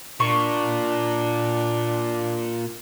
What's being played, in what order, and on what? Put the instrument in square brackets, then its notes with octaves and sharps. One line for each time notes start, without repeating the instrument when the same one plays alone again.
[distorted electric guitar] A#2 [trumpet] D4 [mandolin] C#6